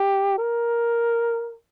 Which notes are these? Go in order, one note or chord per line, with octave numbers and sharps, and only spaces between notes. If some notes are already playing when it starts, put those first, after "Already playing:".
Already playing: G4
A#4